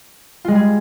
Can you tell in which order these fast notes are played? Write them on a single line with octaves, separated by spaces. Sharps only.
F4 G#3 G3 G#4